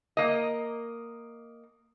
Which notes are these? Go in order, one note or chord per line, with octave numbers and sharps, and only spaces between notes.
A#3 D#5